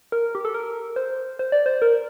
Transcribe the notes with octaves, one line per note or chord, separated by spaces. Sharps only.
A#4
G4
A4
A#4
C5
C5
D5
C5
A#4